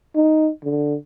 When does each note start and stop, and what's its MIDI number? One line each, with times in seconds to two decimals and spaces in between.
0.16 0.50 63
0.64 0.95 50